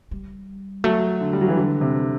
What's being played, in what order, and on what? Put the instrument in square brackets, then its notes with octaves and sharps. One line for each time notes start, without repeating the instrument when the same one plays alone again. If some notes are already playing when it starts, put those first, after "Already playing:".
[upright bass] G3
[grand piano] F#3 [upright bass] A3
[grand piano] D3
G3
F#3
E3
D3
C3